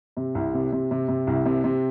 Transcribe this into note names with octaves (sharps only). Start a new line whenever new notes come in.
C3
C2
C3
C3
C3
C3
C2
C3
C3